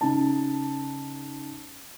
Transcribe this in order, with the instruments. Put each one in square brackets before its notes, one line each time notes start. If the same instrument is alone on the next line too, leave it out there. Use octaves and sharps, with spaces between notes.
[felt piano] C#3 D#4 A5